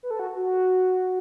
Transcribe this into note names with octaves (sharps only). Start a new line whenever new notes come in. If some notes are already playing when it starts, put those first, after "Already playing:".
B4
A4
F#4
F#4